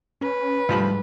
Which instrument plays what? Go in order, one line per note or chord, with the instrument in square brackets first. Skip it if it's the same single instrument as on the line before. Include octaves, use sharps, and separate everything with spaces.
[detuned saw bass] C#4 [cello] B4
[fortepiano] D2 F3 B5 [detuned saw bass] G#2 [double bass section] G3